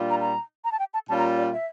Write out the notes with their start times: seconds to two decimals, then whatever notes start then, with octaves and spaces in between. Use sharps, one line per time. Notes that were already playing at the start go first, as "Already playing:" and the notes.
Already playing: A#2 G3 D4 F4
0.10 A#5
0.21 A#5
0.65 A#5
0.72 A5
0.79 G5
0.94 A5
1.09 A#2 G3 C#4 F4 A5
1.18 A#5
1.38 D5
1.53 E5